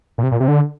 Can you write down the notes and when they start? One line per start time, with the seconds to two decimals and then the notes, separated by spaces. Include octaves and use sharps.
0.18 A#2
0.23 C3
0.32 A#2
0.40 C3
0.48 D3